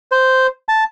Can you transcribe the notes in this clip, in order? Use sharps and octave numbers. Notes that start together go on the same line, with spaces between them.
C5
A5